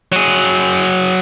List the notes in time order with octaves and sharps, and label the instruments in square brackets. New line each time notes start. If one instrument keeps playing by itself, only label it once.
[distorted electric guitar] F#3 G#4